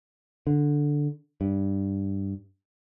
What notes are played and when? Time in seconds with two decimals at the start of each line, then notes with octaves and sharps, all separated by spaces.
0.47 D3
1.41 G2